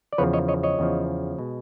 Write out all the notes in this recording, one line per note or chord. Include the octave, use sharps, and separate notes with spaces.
D5
E2 C#3 F3 B4 C#5
C#5 D#5
C#5 D#5
C#5 D#5
E2 C#3 F3
B2 G#3